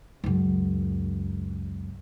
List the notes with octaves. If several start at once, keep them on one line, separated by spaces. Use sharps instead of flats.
C#2 F#2